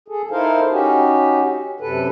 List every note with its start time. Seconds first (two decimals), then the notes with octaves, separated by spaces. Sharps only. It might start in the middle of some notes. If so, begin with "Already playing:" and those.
0.08 G#4 A4
0.31 D#4 E4 A4 A#4 C5 F5
0.71 C#4 D#4 F#4 G4
1.80 F#2 C3 A4 B4